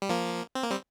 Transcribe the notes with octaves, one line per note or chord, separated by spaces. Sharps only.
G3
F3 A#3
C4
A#3
G3 C4